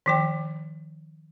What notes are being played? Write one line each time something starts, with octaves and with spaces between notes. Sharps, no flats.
D#3 F3 G5